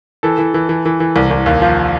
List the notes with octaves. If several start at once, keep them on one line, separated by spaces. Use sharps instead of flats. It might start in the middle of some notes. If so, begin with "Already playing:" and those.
E3 A4
E3
E3
E3
E3
E3
C2
C2
D#2
F3